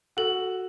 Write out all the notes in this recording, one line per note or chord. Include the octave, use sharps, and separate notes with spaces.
F#4 A4